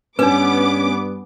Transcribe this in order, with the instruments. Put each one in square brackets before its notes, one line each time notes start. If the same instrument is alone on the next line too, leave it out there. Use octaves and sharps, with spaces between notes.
[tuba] G2 [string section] B3 D6 [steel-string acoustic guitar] C#4 [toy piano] D4 B4